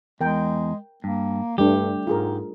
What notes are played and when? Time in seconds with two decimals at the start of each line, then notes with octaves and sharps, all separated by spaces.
0.21 E2 G#3 A#4 G5
1.04 G2 A#3
1.58 G2 G3 A3 D4 G4
2.07 G#2 F4 G#4 A#4